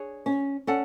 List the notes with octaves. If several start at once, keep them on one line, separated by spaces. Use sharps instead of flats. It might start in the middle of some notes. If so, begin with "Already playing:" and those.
Already playing: D4 G#4 C#5
C#4
C#4 A4 D5 F#5 A5